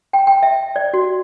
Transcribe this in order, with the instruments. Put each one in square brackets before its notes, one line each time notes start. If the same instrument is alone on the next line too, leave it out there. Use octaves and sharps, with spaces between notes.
[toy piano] G5
G5
E5
D5
F#4